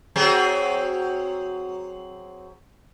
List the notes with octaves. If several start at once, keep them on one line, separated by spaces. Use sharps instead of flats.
F#3 C4 G#4